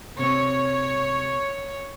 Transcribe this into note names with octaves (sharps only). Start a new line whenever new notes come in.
C3 C4 C#5